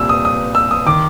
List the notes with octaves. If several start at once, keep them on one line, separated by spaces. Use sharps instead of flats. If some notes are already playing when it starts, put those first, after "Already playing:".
Already playing: C2 A#2 E6
D#6
D#6
E6
D#6
D#3 D6